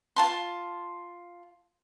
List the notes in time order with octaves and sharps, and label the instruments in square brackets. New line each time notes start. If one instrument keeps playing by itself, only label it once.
[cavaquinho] F4 A5 C6